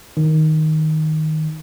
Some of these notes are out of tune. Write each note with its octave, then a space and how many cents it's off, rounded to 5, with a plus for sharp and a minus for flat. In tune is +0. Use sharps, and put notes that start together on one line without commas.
D#3 +5